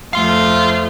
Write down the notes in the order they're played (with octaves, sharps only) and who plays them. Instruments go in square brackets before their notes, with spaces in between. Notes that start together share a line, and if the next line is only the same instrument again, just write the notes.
[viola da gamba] F2 F3 A3 [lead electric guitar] F5 C6